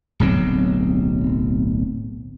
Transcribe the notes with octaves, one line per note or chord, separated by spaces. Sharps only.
D1 B1 F#3 C4